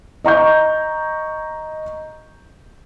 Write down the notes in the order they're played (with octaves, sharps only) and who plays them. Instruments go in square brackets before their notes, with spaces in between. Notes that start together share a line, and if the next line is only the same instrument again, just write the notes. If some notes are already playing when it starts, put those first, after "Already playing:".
[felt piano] D#5 A#5 C#6 G6